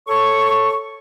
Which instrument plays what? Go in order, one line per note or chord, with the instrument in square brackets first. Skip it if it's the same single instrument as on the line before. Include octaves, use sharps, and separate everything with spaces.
[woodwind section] A4 C#5 C#6